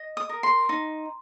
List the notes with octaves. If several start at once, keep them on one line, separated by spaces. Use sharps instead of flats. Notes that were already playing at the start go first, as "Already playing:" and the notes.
Already playing: D#5
D#6
A#4
C6
D#4